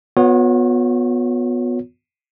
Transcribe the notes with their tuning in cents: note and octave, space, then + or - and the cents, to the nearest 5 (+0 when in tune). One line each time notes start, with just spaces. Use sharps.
B3 +0 F#4 -45 C#5 +0